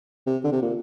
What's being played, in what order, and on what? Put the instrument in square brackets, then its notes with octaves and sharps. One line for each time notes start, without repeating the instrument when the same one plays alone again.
[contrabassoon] C3
D3
C3
A#2